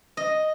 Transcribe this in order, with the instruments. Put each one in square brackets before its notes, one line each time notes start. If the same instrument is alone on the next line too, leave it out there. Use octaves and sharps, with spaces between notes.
[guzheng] D#5